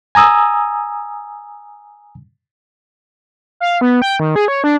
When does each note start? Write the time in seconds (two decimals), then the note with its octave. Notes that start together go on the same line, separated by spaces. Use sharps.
0.15 G#5 A#5 D#6 E6
3.60 F5
3.81 B3
4.02 G5
4.20 D#3
4.36 G#4
4.48 C#5
4.64 D4